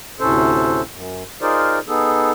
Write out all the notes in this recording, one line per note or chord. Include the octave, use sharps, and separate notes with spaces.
D2 A2 C3 C#4 A4 C5
F#2
D#4 F4 G#4 A#4 C5 D5
B3 D#4 G#4 A4